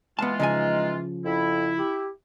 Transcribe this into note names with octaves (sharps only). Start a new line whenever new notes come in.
E3 G#3 B3 F4 A5
C#3 F3 D#4 G#5
F2 E4
G4